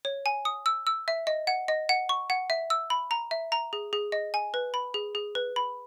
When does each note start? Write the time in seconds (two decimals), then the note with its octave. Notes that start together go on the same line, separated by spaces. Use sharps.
0.05 C#5
0.26 G#5
0.45 D#6
0.66 E6
0.87 E6
1.08 E5
1.27 D#5
1.47 F#5
1.68 D#5
1.89 F#5
2.09 C#6
2.30 F#5
2.50 E5
2.70 E6
2.90 B5
3.11 A#5
3.31 E5
3.52 A#5
3.73 G#4
3.93 G#4
4.12 D#5
4.34 G#5
4.54 B4
4.74 B5
4.94 G#4
5.15 G#4
5.35 B4
5.56 B5